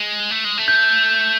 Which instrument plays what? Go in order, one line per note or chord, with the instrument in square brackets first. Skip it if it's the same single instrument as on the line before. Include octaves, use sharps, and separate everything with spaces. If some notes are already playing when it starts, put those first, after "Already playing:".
Already playing: [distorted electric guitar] G#3
A3
G#3
A3
[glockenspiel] G6